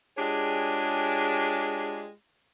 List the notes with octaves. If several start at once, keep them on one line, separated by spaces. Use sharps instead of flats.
G#3 D4 F4 G4 G#4 C#5